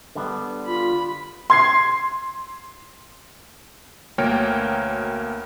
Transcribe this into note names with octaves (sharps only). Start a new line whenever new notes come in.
D3 G3 B3
F4 B5
C6 G#6 C7
D2 B2 A#3 A#4 C#5 G5